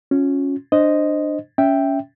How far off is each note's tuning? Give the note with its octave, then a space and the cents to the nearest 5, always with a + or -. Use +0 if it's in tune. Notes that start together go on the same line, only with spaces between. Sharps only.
C#4 +0 F4 +40
D4 +20 C5 +0 D#5 +0
C#4 +20 E5 +0 G5 +0